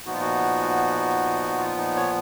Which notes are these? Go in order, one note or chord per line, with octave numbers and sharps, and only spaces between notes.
A#2 F3 B3 D#4 F#4
F4
F#4
F4
D#4
C#5